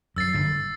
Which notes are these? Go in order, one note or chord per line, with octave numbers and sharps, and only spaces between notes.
F#2 E6 A6 C7
G1 G2